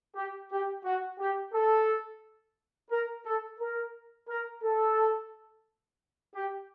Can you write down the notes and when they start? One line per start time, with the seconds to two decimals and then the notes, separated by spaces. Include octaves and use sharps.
0.16 G4
0.51 G4
0.85 F#4
1.19 G4
1.53 A4
2.90 A#4
3.25 A4
3.59 A#4
4.28 A#4
4.62 A4
6.34 G4